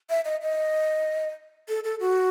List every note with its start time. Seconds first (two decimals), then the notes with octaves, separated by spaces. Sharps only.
0.10 E5
0.25 D#5
0.42 D#5
1.69 A4
1.84 A4
2.00 F#4